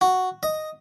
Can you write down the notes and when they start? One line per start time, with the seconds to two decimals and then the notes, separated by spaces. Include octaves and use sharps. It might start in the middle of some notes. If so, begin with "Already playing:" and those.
0.01 F#4
0.43 D#5